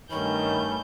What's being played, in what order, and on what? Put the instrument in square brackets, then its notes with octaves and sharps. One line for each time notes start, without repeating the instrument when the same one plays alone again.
[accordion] G2 C#4 [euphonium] D#3 [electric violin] A3 G6 [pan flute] B5